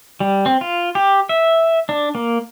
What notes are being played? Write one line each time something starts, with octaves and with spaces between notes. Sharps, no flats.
G3
C4
F4
G4
E5
D4
A#3